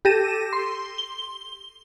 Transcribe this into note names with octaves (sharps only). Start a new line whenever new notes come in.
G4 A4 A#6 D#7 E7
C6
G7